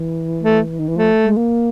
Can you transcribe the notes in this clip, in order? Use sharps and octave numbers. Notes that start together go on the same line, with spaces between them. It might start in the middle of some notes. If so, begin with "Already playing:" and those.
Already playing: E3
A3
D#3
E3
F3 A3
G#3
A#3